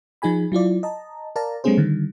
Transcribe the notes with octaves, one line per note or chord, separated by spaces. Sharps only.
F3 D#4 G#4 G#5 B5
F#3 E4 F4 D5
D#5 A5 A#5
A#4 D5 F5 A5 A#5
G3 A3 B3 C#4 G#4 C5
D3 D#3 G3